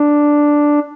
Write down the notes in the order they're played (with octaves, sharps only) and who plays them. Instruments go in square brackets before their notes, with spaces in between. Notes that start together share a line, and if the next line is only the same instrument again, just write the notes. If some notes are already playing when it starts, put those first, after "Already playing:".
Already playing: [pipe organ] D4